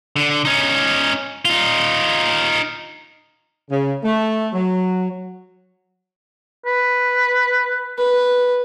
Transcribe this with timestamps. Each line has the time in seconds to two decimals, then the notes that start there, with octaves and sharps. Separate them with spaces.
0.16 D3
0.45 C#4 D#4
1.45 D#4 F4
3.70 C#3
4.03 A3
4.52 F#3
6.66 B4
7.98 B4